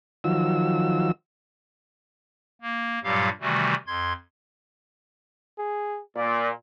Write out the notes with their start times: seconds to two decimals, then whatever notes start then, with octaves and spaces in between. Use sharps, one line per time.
0.24 D#3 F3 F#3 E6
2.61 A#3
3.03 G2 A#2 F#3 G3 G4 F5
3.41 C3 D#3 E3 G3 A3 F#4
3.87 F2 C6 G#6
5.58 G#4
6.16 A#2 D5